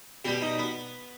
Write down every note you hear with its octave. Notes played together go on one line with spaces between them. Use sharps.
B2 G3 G4
D#4
B3